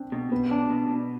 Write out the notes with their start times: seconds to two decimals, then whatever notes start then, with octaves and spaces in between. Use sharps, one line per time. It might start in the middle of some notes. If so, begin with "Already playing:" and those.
Already playing: C4 D4
0.12 B2
0.32 B2 B3
0.51 D4
0.70 B2
0.90 B2